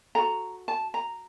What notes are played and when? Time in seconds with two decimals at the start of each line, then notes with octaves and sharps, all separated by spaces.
0.15 F#4 A4 A#5
0.68 A5
0.94 A#5